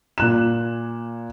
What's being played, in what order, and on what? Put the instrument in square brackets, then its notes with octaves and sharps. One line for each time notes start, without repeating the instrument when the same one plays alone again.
[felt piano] A#2 F#6 E7